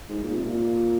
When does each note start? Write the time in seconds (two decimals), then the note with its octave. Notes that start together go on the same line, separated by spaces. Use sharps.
0.09 G#2
0.23 A#2
0.35 C3
0.44 A#2